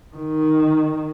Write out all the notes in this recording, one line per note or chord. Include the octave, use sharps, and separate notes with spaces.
D#3